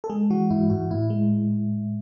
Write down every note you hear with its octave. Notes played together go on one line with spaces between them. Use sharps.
A4
G#3 G#4
E3 F#4
G#2 E4
G#2 F#4
A2 E4
G#3